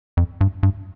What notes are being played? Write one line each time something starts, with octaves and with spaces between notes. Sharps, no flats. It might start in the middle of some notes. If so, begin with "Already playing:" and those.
F2
G2
G2